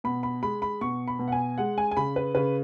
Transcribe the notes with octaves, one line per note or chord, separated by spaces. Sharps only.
B2 B5
B5
G#3 B5
B5
B2 C#6
B5
B2
F#5
G#5
G#3 F#5
G#5
G#5
C#3 B5
B4
C#3 B4